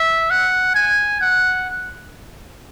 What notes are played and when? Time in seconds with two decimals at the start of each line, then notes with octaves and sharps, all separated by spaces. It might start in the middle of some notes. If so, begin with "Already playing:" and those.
Already playing: E5
0.31 F#5
0.75 G#5
1.21 F#5